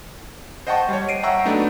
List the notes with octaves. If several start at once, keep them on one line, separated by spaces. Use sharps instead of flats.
C5 D#5 F#5 G5 A5 C#6
G3 C#5
C7 D7 D#7
E5 F#5 G5 A#5 C#6 E6
F#3 A3 B3 D4 D#4